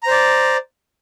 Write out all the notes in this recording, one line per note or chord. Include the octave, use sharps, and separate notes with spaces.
C5 D5 A#5